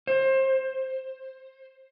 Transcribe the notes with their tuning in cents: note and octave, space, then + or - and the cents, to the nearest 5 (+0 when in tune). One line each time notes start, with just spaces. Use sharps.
C5 +20